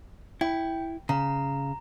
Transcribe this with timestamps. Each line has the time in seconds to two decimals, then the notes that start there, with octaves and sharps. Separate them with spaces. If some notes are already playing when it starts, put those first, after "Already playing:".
0.41 E4 G5
1.09 C#3 A#5